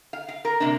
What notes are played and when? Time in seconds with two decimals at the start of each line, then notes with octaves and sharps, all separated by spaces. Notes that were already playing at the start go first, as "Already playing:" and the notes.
0.13 F5
0.28 F5
0.45 A#4
0.60 C3 A#3 D4